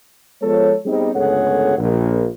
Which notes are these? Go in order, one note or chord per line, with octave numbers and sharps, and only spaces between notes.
F3 G#3 B3 A4 C#5
G3 B3 C4 D#4 G#4
G1 C#2 A3 G#4 C#5 F#5
A#1